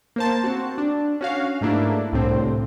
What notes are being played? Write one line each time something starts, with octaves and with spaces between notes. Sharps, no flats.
A#3 C5 A5
C4 F#4
D4
C#4 F#4 F5
G#2 A3 A#3 D4 E4
C2 A2 D3 C4